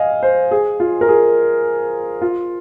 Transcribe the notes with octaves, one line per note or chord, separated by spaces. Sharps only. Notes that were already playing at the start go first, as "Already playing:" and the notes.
Already playing: D#5 F5 G#5
C5
G#4
F4
A#4
G#4
F4